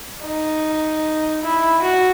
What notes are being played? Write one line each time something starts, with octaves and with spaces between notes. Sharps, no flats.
D#4
E4
F#4